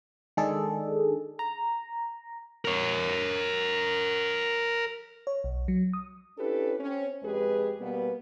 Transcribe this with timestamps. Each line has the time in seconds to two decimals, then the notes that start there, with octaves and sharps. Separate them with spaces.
0.37 D#3 G#3 D4 G#4 A4
1.39 A#5
2.65 A#4 C#5
5.27 C#5
5.44 B1
5.68 F#3
5.93 D#6
6.38 C#4 D4 E4 G4 A4 B4
6.79 C4 C#4
7.23 F2 G#3 G4 G#4 B4
7.79 B2 G3 A#3 B3